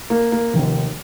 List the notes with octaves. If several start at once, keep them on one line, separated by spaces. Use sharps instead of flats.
A#3
A#3
F1 D#2 D#3